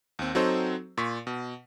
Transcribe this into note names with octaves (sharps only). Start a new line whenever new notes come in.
D#2 C4
F#3 C4 D#4 F#4 A4 C5
A#2 C6 C#6 B6
B2